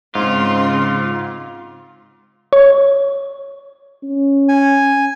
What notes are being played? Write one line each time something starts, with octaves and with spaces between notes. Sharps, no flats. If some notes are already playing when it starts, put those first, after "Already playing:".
G#2 C#3 C4 F4 C6
C#5
C#4
G#5